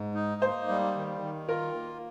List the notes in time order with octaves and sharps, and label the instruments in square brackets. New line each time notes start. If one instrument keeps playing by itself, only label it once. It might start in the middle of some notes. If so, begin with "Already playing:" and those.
Already playing: [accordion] G#2
D#4
[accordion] A#3 [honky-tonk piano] C5
[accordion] G3
D#3
D#3
[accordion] F4 [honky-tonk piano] A#4
[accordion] A#3